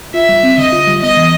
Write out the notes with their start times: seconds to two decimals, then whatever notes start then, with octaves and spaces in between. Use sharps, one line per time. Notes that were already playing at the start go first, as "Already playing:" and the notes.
0.14 F4 E5
0.29 G3
0.43 C4
0.58 D3 D#5
0.72 F4
0.87 G3
1.02 B3 D#5
1.17 E3